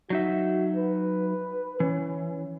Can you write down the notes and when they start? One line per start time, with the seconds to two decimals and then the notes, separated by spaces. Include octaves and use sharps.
0.10 F#3 D#4 F#4 E5
0.76 B4
1.80 E3 C#4